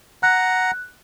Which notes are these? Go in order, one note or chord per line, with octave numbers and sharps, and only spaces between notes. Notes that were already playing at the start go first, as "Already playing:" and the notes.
F#5 A#5 F#6